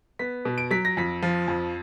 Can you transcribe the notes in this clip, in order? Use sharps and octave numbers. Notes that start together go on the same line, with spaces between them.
B3 B6
B2
D7
F#3 B6
A#6
F2 B6
F3
F2